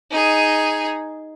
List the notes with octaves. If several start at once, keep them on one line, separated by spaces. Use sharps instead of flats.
D#4 G#4